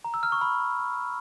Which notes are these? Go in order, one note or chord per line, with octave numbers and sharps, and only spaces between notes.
A#5
E6
F6
C#6
B5